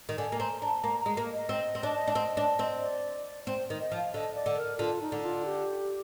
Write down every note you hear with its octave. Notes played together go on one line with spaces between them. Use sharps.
D#3
D3 G#5
A#3
C4 A#5
D4 A#5
A#3 A#5
A#5
G#3
A#3
D#5
C4
C4
D4
D4
C4
D4
C4
D5
C4 C5
D#3
D#5
F3
F5
D3 D#5
D5
D3
A#4
D3 F4
D#4
D3
F4
G4